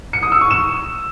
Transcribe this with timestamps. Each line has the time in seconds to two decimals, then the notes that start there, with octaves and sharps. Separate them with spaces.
0.13 C#7
0.23 D#6
0.32 E6
0.41 C#6
0.51 E7